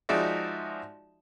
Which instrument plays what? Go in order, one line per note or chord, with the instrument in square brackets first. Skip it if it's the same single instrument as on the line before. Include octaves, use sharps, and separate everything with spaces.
[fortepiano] F3 G#3 D#4 F#4 D5 E5